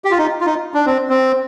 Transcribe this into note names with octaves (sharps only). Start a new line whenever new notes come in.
G4
F4
D#4
F4
D#4
D4
C4
C4